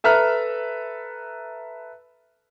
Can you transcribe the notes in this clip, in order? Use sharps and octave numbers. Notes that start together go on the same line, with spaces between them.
A4 B4 E5 A#5 F6